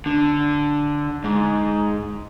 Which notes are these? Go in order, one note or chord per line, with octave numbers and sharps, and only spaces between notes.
D3
G#2